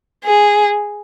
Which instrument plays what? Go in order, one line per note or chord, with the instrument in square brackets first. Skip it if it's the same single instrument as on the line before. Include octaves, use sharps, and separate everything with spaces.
[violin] G#4